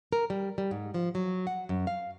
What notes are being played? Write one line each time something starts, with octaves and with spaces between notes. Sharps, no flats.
A#4
G3
G3
G#2
F3
F#3
F#5
F#2
F5